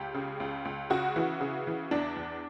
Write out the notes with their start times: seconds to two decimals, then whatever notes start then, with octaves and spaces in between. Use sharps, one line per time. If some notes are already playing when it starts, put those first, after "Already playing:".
Already playing: C#2 G4
0.14 C#3
0.40 C#2
0.65 C#2
0.90 C#3 F#4
1.16 E3
1.41 C#3
1.67 E3
1.91 E2 D4
2.17 E2